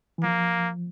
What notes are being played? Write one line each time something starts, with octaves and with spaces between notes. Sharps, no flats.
E3
F3 A#3